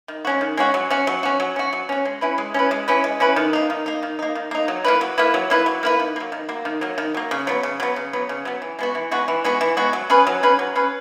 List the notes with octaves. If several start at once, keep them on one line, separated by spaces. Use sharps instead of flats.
D#3
G#3 C#4 F#4
D#3
G#3 C#4 F#4
F#3
C#4 F#4
F#3
C#4 F#4
F#3
C#4 F#4
F#3
C#4 F#4
G#3
C#4 E4 B4
G#3
C#4 E4 B4
G#3
C#4 E4 B4
G#3
C#4 E4 B4
D#3
A#3 D#4
D#3
A#3 D#4
D#3
A#3 D#4
D#3
A#3 D#4
F#3
A#3 E4 B4
F#3
A#3 E4 B4
F#3
A#3 E4 B4
F#3
A#3 E4 B4
D#3
F#3 A#3
D#3
F#3 A#3
D#3
F#3 A#3
D#3
F#3 A#3
C#3
F#3 B3
C#3
F#3 B3
C#3
F#3 B3
C#3
F#3 B3
E3
G#3 B3 F#4
E3
G#3 B3 F#4
E3
G#3 B3 F#4
E3
G#3 B3 F#4
F#3
C#4 G#4 B4
F#3
C#4 G#4 B4
F#3
C#4 G#4 B4